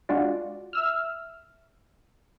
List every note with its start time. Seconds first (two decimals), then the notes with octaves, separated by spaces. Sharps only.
0.09 G#3 D4 F4 F#4 D5
0.73 E5 E6 F6